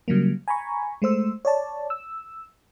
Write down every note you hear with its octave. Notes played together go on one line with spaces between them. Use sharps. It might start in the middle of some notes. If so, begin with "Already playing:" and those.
C#3 F#3 G3 A#3
G#5 A#5 B5 C#6
G#3 A3 C5 E6
C#5 D5 A5
E6